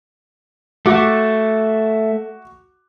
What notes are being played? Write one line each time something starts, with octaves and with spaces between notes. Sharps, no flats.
A3 F#4 D6